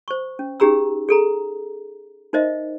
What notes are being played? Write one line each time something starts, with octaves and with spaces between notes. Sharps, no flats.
C5 C#6
C#4
C#4 D#4 G4 G#4 A#5 E6
G#4 A4 A#5
D#4 A#4 C5 D#5 E5